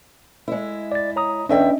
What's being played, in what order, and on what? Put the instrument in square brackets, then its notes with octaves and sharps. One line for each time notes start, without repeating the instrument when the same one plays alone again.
[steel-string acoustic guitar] G#3 E4
[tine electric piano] D5 A6
C#5 A#5 D#6
[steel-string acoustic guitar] E2 E5 G5 [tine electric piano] C#4 D4 D#5